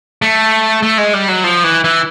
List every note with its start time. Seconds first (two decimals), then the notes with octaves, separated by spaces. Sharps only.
0.22 A3
0.83 A3
0.98 G#3
1.13 G3
1.28 F#3
1.44 F3
1.64 E3
1.84 E3